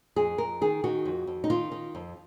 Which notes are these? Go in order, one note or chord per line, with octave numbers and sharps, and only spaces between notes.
F2 G#4
F2 A#4
D#3 G#4
D#3 F#4
F2
F2
D#4
D#3 F4
D#3
F2